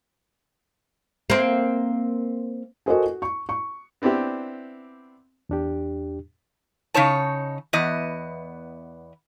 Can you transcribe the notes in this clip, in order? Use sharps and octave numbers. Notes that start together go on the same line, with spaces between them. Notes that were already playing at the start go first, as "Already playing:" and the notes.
A#3 C4
F#4 A4 A#4 C5 D#5 G#5
F#4
C#6
C#6
B3 C4 D4 E4 G4
E2 D4 G4
C#3 D#4 C#5 A5
E2 B3 D#5